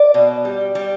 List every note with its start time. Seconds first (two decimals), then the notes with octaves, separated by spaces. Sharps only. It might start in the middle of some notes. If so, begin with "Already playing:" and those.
Already playing: D5
0.14 B2
0.45 G3
0.75 G3